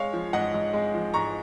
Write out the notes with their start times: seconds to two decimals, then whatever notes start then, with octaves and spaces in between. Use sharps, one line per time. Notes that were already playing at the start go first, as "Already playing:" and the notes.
Already playing: G#3 C#5 F5
0.13 F3
0.33 G#2 D#5 F#5
0.54 G#2
0.73 G#3
0.94 F3
1.14 G#2 A#5 C#6